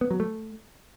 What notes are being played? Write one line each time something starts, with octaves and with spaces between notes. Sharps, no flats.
B3
F#3
A3